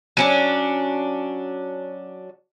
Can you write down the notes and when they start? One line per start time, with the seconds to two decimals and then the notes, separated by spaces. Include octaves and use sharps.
0.17 F#3 C#4 D4